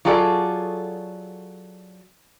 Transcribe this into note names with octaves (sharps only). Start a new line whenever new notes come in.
F#3 F4 G#4 A4 D5